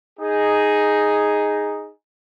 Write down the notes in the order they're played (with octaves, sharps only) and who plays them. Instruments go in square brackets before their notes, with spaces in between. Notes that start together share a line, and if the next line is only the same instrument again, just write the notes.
[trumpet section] D#4 G#4